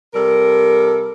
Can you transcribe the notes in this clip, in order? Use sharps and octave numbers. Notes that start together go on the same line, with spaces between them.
C3 G3 A4 A#4